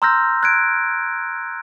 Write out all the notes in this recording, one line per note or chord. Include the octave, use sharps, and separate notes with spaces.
A#5 C6 E6 F6 G6 A#6
F#6 G#6 D7